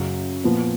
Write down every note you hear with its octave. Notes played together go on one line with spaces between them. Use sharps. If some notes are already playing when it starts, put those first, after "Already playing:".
Already playing: F#2 C#3 F#3
A#2 F3 B3